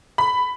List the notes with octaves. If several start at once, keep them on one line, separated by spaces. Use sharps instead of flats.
B5